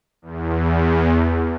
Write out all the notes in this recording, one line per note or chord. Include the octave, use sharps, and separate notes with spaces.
E2